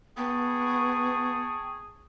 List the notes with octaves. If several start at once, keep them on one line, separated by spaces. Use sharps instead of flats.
B3 G#4 G5 A5 C#6